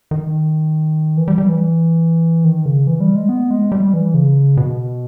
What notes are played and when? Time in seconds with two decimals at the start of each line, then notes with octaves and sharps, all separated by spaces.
0.11 D#3
1.17 E3
1.28 G3
1.38 G3
1.49 E3
2.44 D#3
2.66 C#3
2.87 E3
3.01 G3
3.15 G#3
3.29 B3
3.50 G#3
3.72 G3
3.94 E3
4.14 C#3
4.57 B2